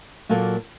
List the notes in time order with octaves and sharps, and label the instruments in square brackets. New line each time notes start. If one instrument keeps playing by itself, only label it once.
[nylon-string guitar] A#2 F#3 A#3 F4 A4